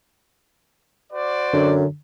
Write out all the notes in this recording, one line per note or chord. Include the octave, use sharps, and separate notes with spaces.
F#4 C5 D5
F#2 D3